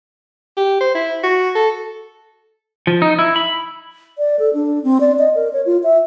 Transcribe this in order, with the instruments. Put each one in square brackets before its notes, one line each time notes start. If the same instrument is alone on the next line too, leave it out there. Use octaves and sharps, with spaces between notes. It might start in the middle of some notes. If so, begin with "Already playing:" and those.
[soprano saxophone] G4
C5
E4
F#4
A4
[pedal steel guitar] F3
D#4
E4
B5
[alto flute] D5
A4
D4
C4
D5
D#5
A#4
C#5
F4
E5